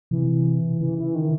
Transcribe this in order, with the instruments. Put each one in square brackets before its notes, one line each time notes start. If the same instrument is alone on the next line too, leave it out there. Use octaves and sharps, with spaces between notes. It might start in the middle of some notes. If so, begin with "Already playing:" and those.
[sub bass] C3 [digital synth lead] E3
[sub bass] C#3 [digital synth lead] E3
[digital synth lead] E3
D#3